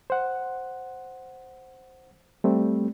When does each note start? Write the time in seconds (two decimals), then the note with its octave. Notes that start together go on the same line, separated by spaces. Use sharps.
0.10 C5 F#5
2.44 G3 A3 C4